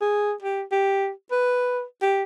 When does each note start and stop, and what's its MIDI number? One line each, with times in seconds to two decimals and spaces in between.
0.01 0.34 68
0.43 0.63 67
0.72 1.10 67
1.32 1.83 71
2.02 2.24 67